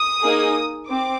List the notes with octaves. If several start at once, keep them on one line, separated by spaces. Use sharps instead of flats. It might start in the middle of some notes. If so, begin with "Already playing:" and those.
Already playing: D#6
A#3 D#4 G#4
C4 D6